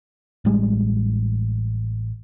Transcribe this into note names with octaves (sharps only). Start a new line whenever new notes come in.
A1 G3 G#3